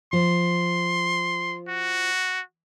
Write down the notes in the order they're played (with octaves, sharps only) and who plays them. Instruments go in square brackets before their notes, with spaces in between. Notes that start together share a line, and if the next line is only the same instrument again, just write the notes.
[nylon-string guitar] F3 [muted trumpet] C6
[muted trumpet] F#4